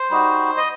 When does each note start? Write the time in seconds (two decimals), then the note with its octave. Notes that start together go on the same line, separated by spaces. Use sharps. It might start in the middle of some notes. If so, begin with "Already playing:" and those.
Already playing: C5
0.10 G3 D#4 F#4
0.57 D#5